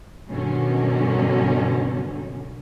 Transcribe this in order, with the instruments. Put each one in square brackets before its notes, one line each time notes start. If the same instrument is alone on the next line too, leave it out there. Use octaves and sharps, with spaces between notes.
[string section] G2 B2 D3 D#3 F#3 C#4